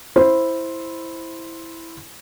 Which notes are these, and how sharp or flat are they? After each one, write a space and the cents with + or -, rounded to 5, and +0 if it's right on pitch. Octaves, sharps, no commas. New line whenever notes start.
E4 +0 C5 +5